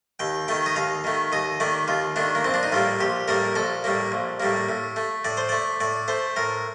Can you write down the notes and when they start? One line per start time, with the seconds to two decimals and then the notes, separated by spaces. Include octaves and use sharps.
0.19 D#2 G5
0.48 D#3 A3 G5
0.66 D#5
0.75 D#2 F5
1.04 D#3 A3
1.32 D#2 D#5
1.60 D#3 A3 D5
1.88 D#2 F4
2.16 D#3 A3 D4
2.35 A#3
2.44 A#1 C4
2.54 D4
2.63 D#4
2.72 A2 G3 A#3 F4
3.00 A#1 G4
3.28 A2 G3 A#3 A#4
3.55 A#1 A4
3.84 A2 G3 A#3
4.12 A#1
4.40 A2 G3 A#3
4.69 A2
4.96 A3
5.24 A2 D5
5.37 C5
5.49 A3 D5
5.80 A2 D5
6.08 A3 C5
6.36 A2 A#4